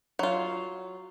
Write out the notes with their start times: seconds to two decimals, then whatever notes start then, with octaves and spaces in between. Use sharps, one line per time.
0.19 F#3 F4